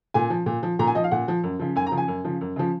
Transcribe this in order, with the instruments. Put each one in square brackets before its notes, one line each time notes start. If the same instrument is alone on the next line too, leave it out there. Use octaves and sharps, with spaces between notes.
[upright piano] A#2 G#5
F3
A#2
F3
A#2 A#5
G#5
F3 D#5
F5
A#2 F#5
F3
F#2
C#3 F3
F#2 G#5
A#5
C#3 F3
G#5
F#2
C#3 F3
F#2
C#3 F3